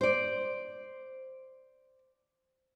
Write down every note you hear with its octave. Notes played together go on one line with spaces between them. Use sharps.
C5 D5